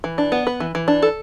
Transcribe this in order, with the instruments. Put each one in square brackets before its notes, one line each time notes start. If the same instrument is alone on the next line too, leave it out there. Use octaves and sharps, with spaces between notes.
[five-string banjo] E3
D4
B3
B4
E3
E3
D4
A4